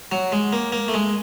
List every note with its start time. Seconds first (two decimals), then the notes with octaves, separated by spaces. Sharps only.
0.12 F#3
0.32 G#3
0.53 A#3
0.72 A#3
0.88 A3
0.94 G#3